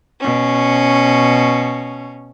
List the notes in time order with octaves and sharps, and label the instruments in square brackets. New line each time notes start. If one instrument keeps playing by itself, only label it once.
[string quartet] B2 C#4